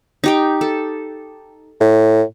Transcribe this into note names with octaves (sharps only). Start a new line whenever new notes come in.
D#4 G4 G5
A4
A2